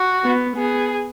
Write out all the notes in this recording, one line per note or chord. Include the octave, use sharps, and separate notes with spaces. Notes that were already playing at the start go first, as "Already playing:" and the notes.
Already playing: F#4
B3
B3 G#4